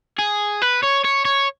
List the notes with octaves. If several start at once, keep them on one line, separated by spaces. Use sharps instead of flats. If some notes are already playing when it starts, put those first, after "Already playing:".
G#4
B4
C#5
C#5
C#5